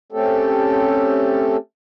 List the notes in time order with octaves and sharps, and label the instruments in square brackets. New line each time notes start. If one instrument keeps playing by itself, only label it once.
[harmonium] A3 C4 C#4 G4 A4